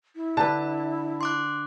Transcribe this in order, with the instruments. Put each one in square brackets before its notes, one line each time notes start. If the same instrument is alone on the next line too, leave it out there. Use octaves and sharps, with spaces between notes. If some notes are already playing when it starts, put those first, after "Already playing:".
[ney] E4
[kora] D3 B4 [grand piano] A5
[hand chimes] C6 D6 F#6